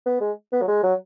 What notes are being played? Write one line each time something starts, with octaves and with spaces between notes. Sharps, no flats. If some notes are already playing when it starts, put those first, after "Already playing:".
B3
G#3
B3
F#3
G#3
F#3